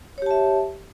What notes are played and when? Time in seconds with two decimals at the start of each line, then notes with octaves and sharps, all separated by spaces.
0.18 C#5
0.22 G4
0.26 A5
0.31 E5